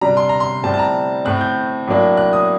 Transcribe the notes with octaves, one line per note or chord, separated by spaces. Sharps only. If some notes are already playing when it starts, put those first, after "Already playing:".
C3 G3 D4 A#5
C6
A#5
C6
A2 G3 C4 A5
A5
A#5
A2 A3 C4 F#6
G6
A2 F#3 A#3 D4
F#6
D#6